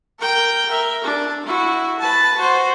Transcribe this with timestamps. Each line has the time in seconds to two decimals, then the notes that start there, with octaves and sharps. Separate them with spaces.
0.20 A#4 G5
0.69 A#4 E5
1.04 D4
1.46 E4 F#4
2.00 B4 A5
2.37 F#4 C5